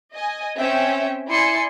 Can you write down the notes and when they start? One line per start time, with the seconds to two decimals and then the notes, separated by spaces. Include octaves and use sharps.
0.13 D#5 G#5
0.58 C4 C#4 E5 G5
1.29 E4 D5 G#5 C6 C#7